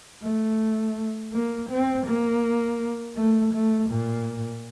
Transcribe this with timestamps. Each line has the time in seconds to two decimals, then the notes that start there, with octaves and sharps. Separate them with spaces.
0.23 A3
1.33 A#3
1.70 C4
2.06 A#3
3.17 A3
3.54 A3
3.90 A#2